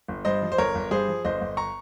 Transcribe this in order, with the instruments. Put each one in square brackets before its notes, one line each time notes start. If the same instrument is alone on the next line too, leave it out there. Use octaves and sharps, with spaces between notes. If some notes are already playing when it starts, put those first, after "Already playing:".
[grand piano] G1
G2 C5 D#5
F3
C5
G1 A#4 C#5
G1
G2 G#4 C5
F3
G1 C5 D#5
G1
A#5 C#6